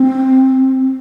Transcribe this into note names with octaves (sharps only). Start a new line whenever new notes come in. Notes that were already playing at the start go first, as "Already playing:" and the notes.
Already playing: C4